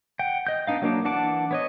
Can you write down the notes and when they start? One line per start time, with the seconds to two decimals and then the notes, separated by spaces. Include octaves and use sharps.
0.19 F#5 G5
0.47 D#5 G6
0.67 B3 D4 D#4 F5
0.82 F#3 A#3 D4
1.05 E3 D4 F#5 A5 D6
1.51 B3 C#5 D#5